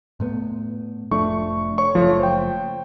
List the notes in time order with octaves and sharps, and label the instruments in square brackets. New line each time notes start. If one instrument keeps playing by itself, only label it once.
[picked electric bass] A2 A3 B3
[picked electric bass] F1 F3 D4 [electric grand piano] A3 C#6
[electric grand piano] C#5 C#6
[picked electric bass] F#1 F2 A3 [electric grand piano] F3 A4 C#5
[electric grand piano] C5 G5